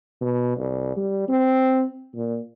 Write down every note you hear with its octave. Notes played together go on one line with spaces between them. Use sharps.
B2
C2
G3
C4
A#2